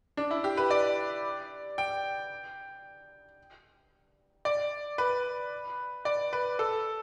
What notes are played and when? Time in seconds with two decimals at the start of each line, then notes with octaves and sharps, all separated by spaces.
0.17 D4
0.31 E4
0.44 G4
0.57 B4
0.71 D5
1.78 G5
4.45 D5
4.98 B4
6.05 D5
6.33 B4
6.59 A4